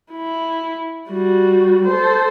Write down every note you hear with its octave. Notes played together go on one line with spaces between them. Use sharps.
E4
G3 F#4
A4 C5